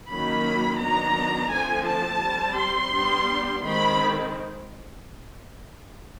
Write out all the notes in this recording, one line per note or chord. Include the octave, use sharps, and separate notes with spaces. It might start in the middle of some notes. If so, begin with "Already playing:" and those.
D#3 F#3 A#3 C#4 B5
D#3 F#3 B3 D4 A#5
D3 F3 A3 C4 G#5
A5
G3 C4
C6
G3 B3 D4
D#3 G#3 C4 B5